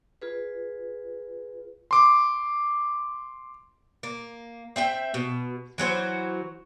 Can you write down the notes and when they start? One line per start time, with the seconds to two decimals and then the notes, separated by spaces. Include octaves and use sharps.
0.22 F4 G#4 B4
1.91 C6 D6
4.03 A#3
4.76 C4 E5 G5
5.14 B2
5.78 E3 F#3 F#4 C5